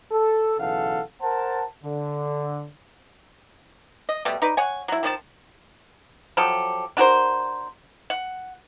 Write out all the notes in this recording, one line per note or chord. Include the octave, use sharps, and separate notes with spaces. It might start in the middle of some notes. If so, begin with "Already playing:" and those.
A4
B1 C#3 E3 A4 F5 F#5
A#4 C5 F#5 A5
D3
D#5
B2 G3 A3
D#4 B4 D5
C#5 F#5 G#5
F#3 E4
D#3 F3 C#4 A5
F3 F#3 G4 A4
D4 F#4 A#4 C5
F#5